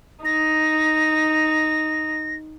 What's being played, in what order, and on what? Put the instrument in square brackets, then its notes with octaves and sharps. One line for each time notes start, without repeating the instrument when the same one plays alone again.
[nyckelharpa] D#4 [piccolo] A#6